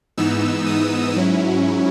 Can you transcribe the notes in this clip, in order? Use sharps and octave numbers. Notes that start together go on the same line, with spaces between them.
G#2 E3 B3 D#4 E6
D#6
G#2 F#3 C#4 E4